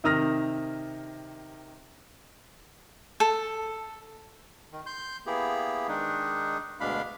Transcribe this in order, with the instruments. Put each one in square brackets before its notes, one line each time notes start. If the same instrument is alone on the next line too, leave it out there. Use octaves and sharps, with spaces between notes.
[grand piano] C3 D#3 D#6 F6 A#6
[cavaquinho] A4
[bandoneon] D#3
C6 G6
A#3 B3 E4 G4 G#4
D#3 G#3 D4 D#4
D2 B2 G#3 D4 F5 B5